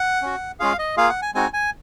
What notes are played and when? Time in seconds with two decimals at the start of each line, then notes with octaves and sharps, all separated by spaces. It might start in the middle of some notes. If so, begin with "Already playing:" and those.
Already playing: F#5
0.22 C#4 F#4
0.60 G#3 C#4 F4 G#4 F5
0.79 D#5
0.97 A#3 F4 G#4 F5
1.09 F#5
1.22 G#5
1.34 G#3 C4 D#4 F#4 G#5
1.53 G#5